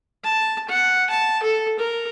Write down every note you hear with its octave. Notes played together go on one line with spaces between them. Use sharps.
A5
F#5
A5
A4
A#4